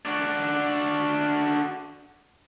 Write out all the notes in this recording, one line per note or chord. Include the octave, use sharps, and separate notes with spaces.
D4 F#4